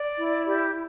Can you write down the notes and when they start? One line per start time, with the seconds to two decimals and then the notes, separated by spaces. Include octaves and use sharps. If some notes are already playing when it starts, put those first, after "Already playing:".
Already playing: D5
0.16 E4
0.46 G4